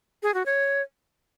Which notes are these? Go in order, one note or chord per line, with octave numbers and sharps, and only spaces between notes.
G#4
F#4
C#5